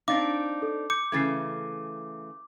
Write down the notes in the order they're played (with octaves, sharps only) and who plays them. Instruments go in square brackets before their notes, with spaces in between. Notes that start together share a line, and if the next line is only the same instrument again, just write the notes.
[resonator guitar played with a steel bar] C4 D4 D#4 [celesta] F5 A6 [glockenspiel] D6
[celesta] A4
[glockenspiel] D6 [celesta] G6 C#7
[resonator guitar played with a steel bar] C#3 E3 A3 [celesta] G#6 A6 C7